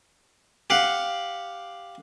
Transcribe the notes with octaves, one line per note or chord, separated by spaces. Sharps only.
G4 F5 F#5